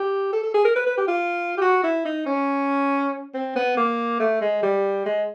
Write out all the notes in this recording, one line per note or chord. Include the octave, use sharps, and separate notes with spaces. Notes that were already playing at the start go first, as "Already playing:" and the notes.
Already playing: G4
A4
A4
G#4
A#4
B4
B4
G4
F4
G4
F#4
E4
D#4
C#4
C4
B3
A#3
A3
G#3
G3
G#3